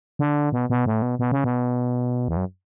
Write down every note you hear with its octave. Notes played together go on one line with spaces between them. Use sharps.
D3
B2
B2
A2
B2
B2
C#3
B2
E2
F#2